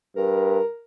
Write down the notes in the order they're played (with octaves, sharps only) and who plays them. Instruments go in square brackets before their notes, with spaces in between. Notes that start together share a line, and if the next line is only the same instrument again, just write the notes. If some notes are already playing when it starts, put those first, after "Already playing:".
[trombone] G2 [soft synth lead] A#4